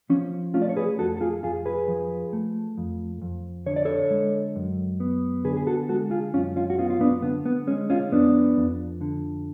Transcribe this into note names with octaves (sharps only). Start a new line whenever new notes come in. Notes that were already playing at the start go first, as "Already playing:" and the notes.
F3 C#4
A3 C#4 F4
D5
C#5
G#4 B4
F2 F#4 A4
A4
F4 G#4
F2 F4 G#4
G#4 B4
F3
A3
F2
F2
D3 C#5
D5
A4 C#5
G#3
F#2
B3
D3 G#4 B4
G#4
F#4 A4
G#3 F#4 A4
F4 G#4
F#2 C#4 F4
C#4 F4
F#4
B3 C#4 F4
F4
B3 D4
D3 B3
B3
G#3 C#4
C#4 F4
F2 B3 D4
F2
D3